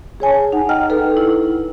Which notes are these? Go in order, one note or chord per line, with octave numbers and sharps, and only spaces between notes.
G#4 C#5 G#5 A5
D#4 F#5
D#5 F#5 G5 A#5 F6
D#4 A4 B4
E4